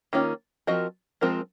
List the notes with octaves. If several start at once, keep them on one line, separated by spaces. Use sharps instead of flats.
D#3 A#3 C#4 F4
F3 C4 F#4 A#4 D#5
F3 G#3 C4 F4 A#4